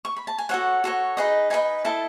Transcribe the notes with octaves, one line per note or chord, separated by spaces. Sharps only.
C#6
B5
A5
G#5
F#4 A4 C#5 F#5
F#4 A4 C#5
D#4 G#4 B4 D#5
D#4 G#4 B4 D#5 G#5
E4 A4 D#5 A5